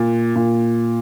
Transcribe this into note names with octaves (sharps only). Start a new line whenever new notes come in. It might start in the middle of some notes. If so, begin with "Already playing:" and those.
Already playing: A#2
A#2